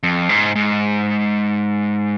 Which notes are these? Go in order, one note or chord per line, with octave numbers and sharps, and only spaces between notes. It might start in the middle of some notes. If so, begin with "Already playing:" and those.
F2
G#2
G#2